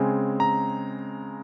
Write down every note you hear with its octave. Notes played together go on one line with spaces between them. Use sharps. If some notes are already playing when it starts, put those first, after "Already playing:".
Already playing: C#3 G#3 C4 G#5
A#5